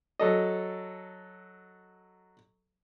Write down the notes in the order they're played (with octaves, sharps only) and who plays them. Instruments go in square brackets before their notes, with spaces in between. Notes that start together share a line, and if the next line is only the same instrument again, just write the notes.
[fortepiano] F#3 A4 D#5